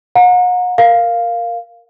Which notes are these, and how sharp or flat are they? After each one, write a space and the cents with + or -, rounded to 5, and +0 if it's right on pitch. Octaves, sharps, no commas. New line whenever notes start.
F#5 -40 A#5 +0
A#4 +0 F5 +0